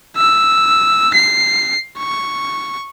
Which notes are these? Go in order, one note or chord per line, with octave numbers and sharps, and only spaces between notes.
E6
C7
C#6